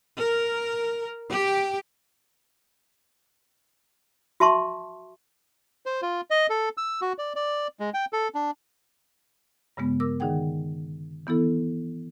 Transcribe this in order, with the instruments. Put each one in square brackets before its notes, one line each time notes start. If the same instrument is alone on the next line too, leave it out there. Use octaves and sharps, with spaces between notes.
[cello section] A#4
G4
[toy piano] F#4 E5 A5 C6 C#6
[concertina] C5
F4
D#5
A4
E6
F#4
D5
D5
G#3
G5
A4
D4
[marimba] G2 C#3 G#3 B3
A#4 D6 E6
D3 D#3 D#4 G#4 F#5 G5
E3 B3 E4 A4